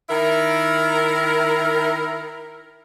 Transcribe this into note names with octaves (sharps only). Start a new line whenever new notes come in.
D#3 E4 A#4